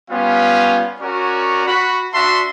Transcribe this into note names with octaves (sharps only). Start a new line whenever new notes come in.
G3 B3 C#4 F4 F5
C#4 F#4 A#4 C#5 D5
F#4 B5
D4 F#4 E5 A5 C6